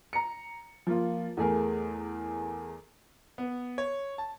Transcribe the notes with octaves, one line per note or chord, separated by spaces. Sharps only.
A#5 C#7
F3 A#3 F4
E2 A3 G#4 A#4
B3
C#5
A5